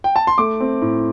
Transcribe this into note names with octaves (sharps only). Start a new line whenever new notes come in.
G5
A5
C6
A3 D6
C4
A2